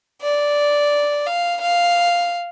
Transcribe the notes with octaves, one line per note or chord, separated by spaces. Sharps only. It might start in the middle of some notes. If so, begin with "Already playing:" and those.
D5
F5
F5